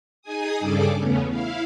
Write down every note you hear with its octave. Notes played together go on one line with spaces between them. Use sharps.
D#4 G#4 G#5 D#6
G2 C#3 G3 G#4 A4 D6
E2 C#3 A3 B3 C#4
E4 F5